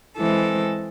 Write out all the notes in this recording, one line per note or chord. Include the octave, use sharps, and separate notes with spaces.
E3 G#3 C4 A4